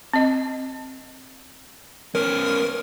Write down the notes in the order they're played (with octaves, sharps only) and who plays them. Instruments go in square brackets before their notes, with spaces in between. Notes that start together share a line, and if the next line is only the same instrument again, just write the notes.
[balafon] C4 D#5
[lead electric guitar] B3 C#4 [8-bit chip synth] A#4